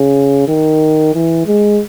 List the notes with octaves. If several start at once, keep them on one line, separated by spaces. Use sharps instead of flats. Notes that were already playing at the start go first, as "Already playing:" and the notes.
Already playing: C#3
D#3
E3
G#3